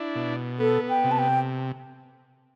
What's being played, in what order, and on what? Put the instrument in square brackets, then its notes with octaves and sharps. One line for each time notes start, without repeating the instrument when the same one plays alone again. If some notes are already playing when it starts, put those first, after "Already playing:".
Already playing: [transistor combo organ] D4 E4
B2
[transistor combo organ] B3 [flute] A4
[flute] G5
[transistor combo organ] C3
[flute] A5
G5